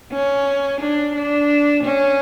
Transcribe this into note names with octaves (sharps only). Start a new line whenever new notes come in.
C#4
D4
D4
C#4